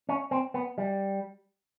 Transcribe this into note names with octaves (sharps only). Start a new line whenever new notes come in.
C#4
C4
B3
G3